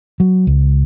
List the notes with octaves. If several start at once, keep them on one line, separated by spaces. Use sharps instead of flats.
F#3
C#2